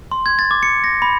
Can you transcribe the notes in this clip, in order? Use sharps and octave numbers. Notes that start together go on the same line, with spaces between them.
C6
G#6
A6
D6
C#7
A#6
B5